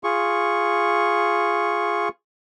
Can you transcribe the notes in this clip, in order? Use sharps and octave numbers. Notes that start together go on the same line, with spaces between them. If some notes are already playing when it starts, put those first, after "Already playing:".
F4 G#4 C#6